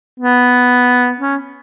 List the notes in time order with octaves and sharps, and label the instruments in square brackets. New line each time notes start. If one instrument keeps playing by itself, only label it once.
[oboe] B3
C#4